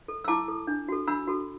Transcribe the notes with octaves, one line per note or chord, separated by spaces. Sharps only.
A4
E6
E4 A5 D6
A4
D4
F#4 A4
D4 B5 E6
F#4 A4